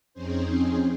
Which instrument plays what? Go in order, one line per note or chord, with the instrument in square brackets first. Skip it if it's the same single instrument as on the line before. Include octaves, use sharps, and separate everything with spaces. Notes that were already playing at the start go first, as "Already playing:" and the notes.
[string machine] F2 C4 C#4 D#4 G#4 C5